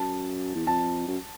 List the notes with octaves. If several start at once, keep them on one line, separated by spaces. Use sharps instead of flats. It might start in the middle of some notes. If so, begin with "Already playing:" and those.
Already playing: F#2 A5
E2
F2 A5
F#2